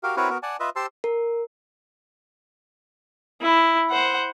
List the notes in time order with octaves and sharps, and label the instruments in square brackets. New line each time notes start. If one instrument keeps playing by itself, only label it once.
[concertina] F#4 G4 A#4 F5
C4 E4 F#4 A#4 B4 C#5
B3 F#4 A#4
D5 F#5 G#5 A5
F4 B4 D#5 E5
G4 C5 A5 C6 E6
[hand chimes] A#4
[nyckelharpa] E4
C5 F#5